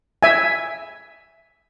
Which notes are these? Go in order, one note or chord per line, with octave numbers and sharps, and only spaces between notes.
E5 G#5